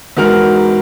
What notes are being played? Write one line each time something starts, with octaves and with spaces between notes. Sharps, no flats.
E2 G#2 F#4 A#4 F6